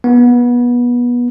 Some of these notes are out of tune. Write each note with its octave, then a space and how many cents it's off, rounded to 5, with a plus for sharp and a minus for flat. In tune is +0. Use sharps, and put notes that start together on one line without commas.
B3 -25